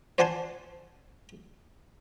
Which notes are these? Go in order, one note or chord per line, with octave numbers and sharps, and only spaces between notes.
C5 D5 F#5 G#5 A5 C6